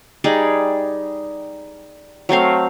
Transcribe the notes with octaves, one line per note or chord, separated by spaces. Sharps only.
G3 D#4 G#4 D5
F#3 A3 C4 F5